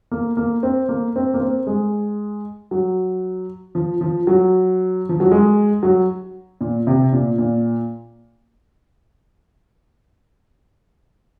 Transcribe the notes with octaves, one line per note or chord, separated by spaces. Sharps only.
A#3
A#3
C4
A#3
C4
A#3
C4
G#3
F#3
F3
F3
F#3
F3
F#3
G#3
F#3
A#2
C3
A#2
A#2